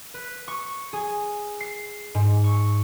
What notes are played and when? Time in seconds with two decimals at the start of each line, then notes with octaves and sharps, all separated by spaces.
0.14 B4
0.48 C#6
0.93 G#4
1.60 C7
2.15 G#2
2.44 C#6